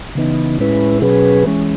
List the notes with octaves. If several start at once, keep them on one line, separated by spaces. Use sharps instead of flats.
C#3 E3 B3 D#4
A2 G#3 C#4 E4 B4
B2 F#3 C#4 G#4 B4
E3 G#3 C#4